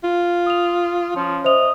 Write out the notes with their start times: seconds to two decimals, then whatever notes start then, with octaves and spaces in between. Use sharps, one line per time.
0.04 F4
0.46 D#6 F7
1.16 F3 C#4
1.44 C5 D#5 E5 F7